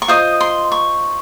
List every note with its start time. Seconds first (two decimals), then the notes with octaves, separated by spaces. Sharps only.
0.02 C#6
0.08 F4 C5 D#5 D#6
0.40 C6
0.72 C#6